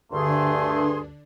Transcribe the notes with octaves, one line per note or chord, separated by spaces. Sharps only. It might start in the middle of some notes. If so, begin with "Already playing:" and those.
D2 G2 D3 A3 D4 G#4 C6